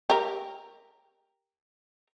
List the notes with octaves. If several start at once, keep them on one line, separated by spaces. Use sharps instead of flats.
G4 A#4